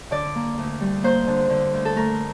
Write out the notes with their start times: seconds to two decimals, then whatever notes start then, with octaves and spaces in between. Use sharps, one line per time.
0.11 D3 D5
0.35 A#3
0.58 D2
0.81 G3
1.03 A#3 C5
1.27 D3
1.50 D3
1.73 D2
1.85 A4
1.96 A3 A#4